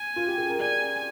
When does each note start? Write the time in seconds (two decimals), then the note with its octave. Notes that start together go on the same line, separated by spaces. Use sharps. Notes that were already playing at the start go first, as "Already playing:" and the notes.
Already playing: G#5
0.16 F4
0.26 G4
0.38 G#4
0.49 A#4
0.60 D5 G#5